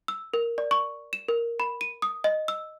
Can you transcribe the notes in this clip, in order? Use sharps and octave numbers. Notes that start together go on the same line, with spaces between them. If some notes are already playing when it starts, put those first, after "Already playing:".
E6
A#4
D5
C#6
E7
A#4
B5
D#7
D#6
D#5
E6